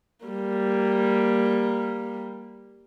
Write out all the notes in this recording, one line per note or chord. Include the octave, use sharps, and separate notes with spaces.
G3 A#3